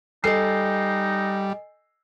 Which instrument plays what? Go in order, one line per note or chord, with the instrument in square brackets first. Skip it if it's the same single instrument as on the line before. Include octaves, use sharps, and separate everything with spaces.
[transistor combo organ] G3 [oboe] D#4 [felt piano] A4 C7 [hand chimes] D#5 G#5